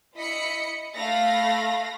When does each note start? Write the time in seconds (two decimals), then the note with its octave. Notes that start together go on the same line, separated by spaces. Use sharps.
0.16 E4 D#5 B5 B6 C#7
0.97 A3 F5 B5 A#6